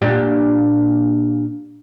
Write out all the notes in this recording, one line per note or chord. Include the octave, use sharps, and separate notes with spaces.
A#2 D4 G4